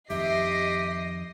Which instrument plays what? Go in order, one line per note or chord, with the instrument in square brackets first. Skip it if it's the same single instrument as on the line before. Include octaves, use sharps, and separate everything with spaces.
[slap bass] F2 D#3 [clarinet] G4 [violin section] D#5 A#6 C7 [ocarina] E5